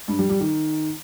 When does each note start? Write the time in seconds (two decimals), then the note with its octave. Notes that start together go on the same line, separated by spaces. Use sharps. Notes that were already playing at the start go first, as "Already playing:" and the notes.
0.08 G2
0.19 G3
0.30 G3
0.40 D#3